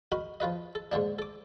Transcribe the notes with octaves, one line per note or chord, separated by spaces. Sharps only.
D#4 F#4 A#4 B5
F3 F4 B4 D#5
A4
G#2 D3 A#3 D4
A4 D6